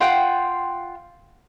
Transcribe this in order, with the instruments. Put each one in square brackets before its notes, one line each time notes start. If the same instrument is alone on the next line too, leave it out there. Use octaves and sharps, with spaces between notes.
[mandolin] F4 F#5 G5 C6